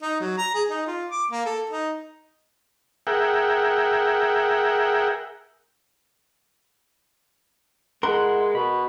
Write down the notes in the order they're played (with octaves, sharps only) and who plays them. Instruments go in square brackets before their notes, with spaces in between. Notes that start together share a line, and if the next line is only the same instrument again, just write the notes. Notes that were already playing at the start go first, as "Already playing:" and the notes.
[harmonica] D#4
F#3
A#5
G#4
D#4
F4
D6
A#3
A4
D#4
[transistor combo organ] G#4 A#4 E5 F#5 G5
[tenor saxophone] G#3 [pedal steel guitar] E4 F#5 C6 [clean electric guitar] A#4
[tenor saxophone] B2 [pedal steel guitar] B5